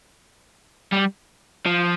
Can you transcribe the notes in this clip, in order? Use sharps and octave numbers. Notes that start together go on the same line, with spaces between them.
G3
F3